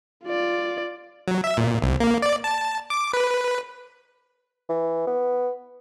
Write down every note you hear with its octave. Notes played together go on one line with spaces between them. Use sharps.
F4 D5
F#3
E5
A#2
C2
A#3
D5
A5
D6
B4
E3
B3